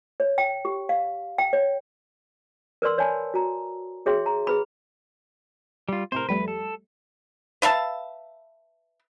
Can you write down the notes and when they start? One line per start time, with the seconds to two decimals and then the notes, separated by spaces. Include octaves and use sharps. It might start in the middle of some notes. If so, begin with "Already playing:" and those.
0.20 C#5
0.38 G5
0.65 G4
0.89 F5
1.38 G5
1.53 C#5
2.82 A#4 B4 D5 C6 E6
2.98 C#5 D5 F#5 G#5 A5 B5
3.34 F#4 A#5
4.06 F#4 G#4 C#5 E5 G5 C6
4.26 A#5
4.47 G#4 B4 B5
5.89 G3 F4
6.12 A2 C3 A#4 C5
6.29 F2 G3 A3 B4
6.48 A4
7.62 B4 E5 F5 A5